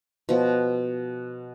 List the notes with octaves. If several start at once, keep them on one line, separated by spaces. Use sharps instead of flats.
B2 F3